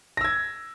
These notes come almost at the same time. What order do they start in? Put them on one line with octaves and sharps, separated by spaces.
A#6 E6 G#6